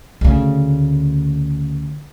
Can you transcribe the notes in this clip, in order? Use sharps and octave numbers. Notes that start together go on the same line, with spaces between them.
D2 C#3